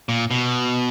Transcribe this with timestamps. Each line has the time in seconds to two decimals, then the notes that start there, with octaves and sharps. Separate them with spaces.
0.09 A#2
0.31 B2